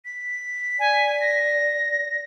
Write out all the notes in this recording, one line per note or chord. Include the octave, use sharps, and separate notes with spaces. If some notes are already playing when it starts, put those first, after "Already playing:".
B6
D5 G#5
A#6